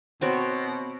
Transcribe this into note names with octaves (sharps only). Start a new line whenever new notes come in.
B2 C4 F#4 C#5